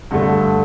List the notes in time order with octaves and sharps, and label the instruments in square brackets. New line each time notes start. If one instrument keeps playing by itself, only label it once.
[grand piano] G2 D3 A3